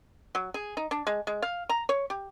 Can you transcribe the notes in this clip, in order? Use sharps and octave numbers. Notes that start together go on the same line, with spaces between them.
F#3
G#4
D#4
D4
G#3
G#3
F5
A#5
C#5
G4